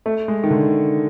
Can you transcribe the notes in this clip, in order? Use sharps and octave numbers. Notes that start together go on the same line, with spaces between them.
A3
G#3
D#3
D3